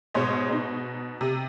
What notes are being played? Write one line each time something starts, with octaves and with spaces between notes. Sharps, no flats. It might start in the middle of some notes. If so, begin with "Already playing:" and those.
G#2 B2 G#3 C5 C#5 D#5
B2 D#4
C3